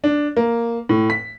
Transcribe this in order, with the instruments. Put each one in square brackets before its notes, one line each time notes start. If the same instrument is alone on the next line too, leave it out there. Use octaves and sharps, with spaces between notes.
[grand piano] D4
A#3
A2
B6